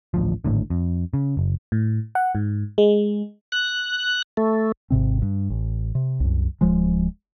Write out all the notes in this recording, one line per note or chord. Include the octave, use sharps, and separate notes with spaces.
A1 D2 F3
G#1 A2 D3
F2
C#3
F#1
A2
F#5
G#2
G#3
F#6
A3
G#1 G#2 C3 C4
G2
A1
C3
C2 F#2
D1 F3 G#3